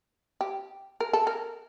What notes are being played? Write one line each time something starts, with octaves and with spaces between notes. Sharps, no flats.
G4
A#4
A4
A#4